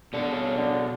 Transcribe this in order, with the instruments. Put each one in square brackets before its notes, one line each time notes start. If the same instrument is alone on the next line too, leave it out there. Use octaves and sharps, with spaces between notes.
[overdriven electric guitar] B2 A4 [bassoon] D3
[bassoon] C#3
D3